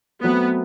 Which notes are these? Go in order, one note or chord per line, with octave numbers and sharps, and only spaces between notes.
F#3 A3 B3 C4 F#4